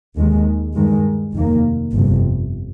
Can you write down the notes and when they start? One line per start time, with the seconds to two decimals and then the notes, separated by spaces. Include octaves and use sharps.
0.17 D#2 D#3 G#3
0.75 G2 D#3 G#3
1.34 F1 D#2 D#3 A#3
1.93 G1 F2 C3